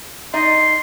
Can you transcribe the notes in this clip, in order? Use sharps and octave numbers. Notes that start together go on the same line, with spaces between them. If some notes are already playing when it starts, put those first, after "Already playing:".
D#4 D5 D#5 C6